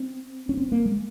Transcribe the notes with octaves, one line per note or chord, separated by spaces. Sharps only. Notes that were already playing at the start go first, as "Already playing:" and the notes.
Already playing: C4
C#4
C4
A#3
G#3